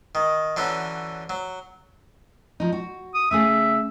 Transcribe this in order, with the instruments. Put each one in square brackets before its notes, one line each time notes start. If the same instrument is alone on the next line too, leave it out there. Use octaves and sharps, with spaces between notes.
[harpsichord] D#3
D3 E3 F#3 C#4
F#3
[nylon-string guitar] F3 D#4
F#4
[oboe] D#6
[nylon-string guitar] C#3 A3 G#4 [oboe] E5